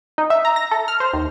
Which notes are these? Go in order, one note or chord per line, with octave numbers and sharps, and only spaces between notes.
D#4
E5
A#5
A#6
A4
F6
C5
D#2